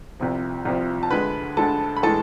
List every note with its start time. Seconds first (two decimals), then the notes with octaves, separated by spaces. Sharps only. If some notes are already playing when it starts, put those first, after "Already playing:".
0.20 C2 C3 F3
0.65 C2 C3 F3
1.03 A5
1.11 D2 D3 G#3 B4 B5
1.57 D2 D3 G#3 A4 A5
1.97 B5
2.03 A2 E3 G#3 A4 A5